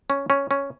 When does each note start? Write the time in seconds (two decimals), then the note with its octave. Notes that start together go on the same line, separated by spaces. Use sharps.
0.10 C#4
0.30 C#4
0.51 C#4